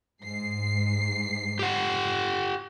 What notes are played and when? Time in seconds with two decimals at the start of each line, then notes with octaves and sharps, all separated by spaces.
0.23 G#2 C7
1.59 G4 F#5